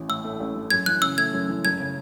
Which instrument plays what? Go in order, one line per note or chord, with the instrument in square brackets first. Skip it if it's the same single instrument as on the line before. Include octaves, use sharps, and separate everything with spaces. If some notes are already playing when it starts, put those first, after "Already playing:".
Already playing: [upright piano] A1 E3
[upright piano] A2 [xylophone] E6
[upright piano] A3
A1
E3
[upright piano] F#2 [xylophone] G#6
[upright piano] E3 [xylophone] F#6
[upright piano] C#3 [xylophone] E6
[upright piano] A3 [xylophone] G#6
[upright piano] F#2
E3
[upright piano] F#1 [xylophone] G#6
[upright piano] C#3